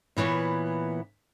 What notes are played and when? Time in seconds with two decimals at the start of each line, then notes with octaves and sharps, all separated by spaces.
0.17 A#2 E3 B3 C#5